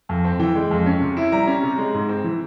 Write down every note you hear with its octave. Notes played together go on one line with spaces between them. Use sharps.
F2
C4
E3 G5
G#3
F2
C#4
C3
E4
G3 A#5
C#4
C3
G#3
G#2
C4
E3